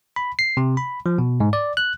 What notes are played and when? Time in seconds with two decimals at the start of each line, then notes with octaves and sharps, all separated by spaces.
0.16 B5
0.39 C7
0.57 C3
0.77 B5
1.06 F3
1.19 B2
1.40 G#2
1.53 D5
1.77 F#6